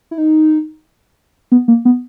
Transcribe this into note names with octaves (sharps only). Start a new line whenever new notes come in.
E4
D#4
B3
A#3
B3